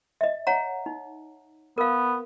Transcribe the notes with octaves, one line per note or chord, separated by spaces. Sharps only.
D#5 E5
C#5 F#5 A#5
D#4
B3 A#4 F5